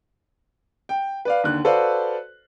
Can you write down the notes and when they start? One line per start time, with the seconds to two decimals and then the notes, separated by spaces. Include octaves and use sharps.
0.89 G5
1.25 B4 D5 F5
1.44 D#2 D3 F#6
1.64 F#4 A4 B4 C5 D5 F5